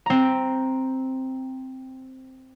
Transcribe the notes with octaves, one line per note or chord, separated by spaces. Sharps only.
C4 A#5